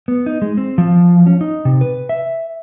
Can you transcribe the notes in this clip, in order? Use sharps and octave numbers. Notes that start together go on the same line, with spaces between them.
B3
D#4
G#3
C4
F3
C#4
D#4
C3
B4
E5